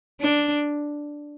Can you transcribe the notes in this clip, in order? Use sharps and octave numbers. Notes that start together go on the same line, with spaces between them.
D4